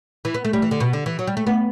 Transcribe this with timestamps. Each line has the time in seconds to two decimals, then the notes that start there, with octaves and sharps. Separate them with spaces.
0.25 E3
0.34 B3
0.45 A3
0.53 G3
0.62 E3
0.71 D3
0.80 B2
0.93 D3
1.06 E3
1.19 F#3
1.27 G3
1.37 A3
1.47 B3